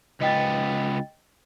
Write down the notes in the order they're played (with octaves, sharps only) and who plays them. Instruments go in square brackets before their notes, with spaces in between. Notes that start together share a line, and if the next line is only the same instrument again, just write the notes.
[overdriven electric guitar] C#2 B3 [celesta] D#5 G5 A6